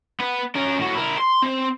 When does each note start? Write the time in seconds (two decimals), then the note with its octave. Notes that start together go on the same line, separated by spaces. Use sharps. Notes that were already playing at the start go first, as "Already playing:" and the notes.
0.20 B3 B4
0.56 C#4 A#4
0.78 A2 F#4
0.95 E4 A#4
1.18 C6
1.42 C4 C5